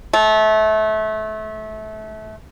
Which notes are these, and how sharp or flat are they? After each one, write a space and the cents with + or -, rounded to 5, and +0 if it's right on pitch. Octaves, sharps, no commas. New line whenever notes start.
A3 -25